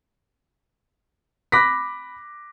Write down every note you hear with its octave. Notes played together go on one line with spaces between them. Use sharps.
B5 D6 F#6 A#6 B6